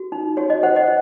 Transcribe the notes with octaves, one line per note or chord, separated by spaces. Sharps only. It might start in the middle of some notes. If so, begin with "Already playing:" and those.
Already playing: F#4
D#4
F#4 C#5
D#5
C5 F#5
D#5